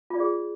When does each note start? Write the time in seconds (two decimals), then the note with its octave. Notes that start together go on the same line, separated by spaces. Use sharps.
0.10 F4
0.15 D5
0.20 G#4